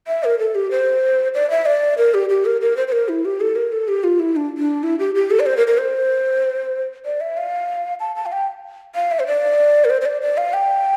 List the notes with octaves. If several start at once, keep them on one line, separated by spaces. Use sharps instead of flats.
E5
A#4
A4
G4
C5
D5
E5
D5
A#4
G4
G4
A#4
A#4
C5
C5
A#4
E4
G4
A4
A#4
A4
G4
F4
E4
D4
D4
E4
G4
G4
A4
D5
C5
A#4
A#4
C5
D5
E5
F5
A5
A5
F5
G5
F5
E5
C5
D5
A#4
C5
C5
D5
D5
F5
G5